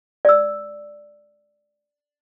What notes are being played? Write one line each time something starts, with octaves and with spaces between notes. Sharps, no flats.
D5 E6